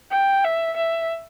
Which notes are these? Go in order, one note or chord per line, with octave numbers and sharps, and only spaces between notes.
G5
E5
E5